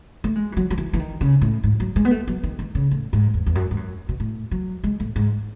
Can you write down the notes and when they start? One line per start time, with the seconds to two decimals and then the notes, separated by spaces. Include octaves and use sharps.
0.24 A3
0.35 G#3
0.52 E3
0.57 F#3
0.70 F#3
0.78 E3
0.93 E3
0.99 D#3
1.21 C#3
1.41 A2
1.64 G#2
1.80 F#3
1.96 G#3
2.05 B3
2.11 A3
2.27 F#3
2.44 D#3
2.59 D#3
2.75 C#3
2.91 A2
3.13 G#2
3.34 E2
3.46 E2
3.55 F#2
3.71 G#2
3.77 F#2
4.09 B2
4.20 A2
4.51 F#3
4.84 G#3
5.00 A2
5.16 G#2